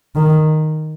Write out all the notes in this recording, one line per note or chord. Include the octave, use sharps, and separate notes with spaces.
D#3